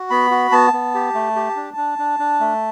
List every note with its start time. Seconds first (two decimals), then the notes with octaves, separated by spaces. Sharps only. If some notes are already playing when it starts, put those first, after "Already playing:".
Already playing: F#4
0.10 B3 B5
0.31 F#4
0.52 B3 A5
0.73 B3
0.94 G4
1.15 A3
1.36 G4
1.56 D4
1.77 D4
1.98 D4
2.19 D4
2.40 A3